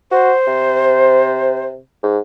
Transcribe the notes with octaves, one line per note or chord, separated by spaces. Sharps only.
F#4 C5
C3
G#2